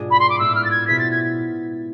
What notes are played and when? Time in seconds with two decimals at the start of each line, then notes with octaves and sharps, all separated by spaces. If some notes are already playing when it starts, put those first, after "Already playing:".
Already playing: G#2 B2 G#3 D4 F4 G#4
0.11 B5
0.20 C6
0.30 D6
0.39 A2 G#3 B3 D4 F4 E6
0.55 F6
0.65 A6
0.71 G#6
0.87 B2 B3 E4 G#4 C5 B6
0.99 A6
1.11 G#6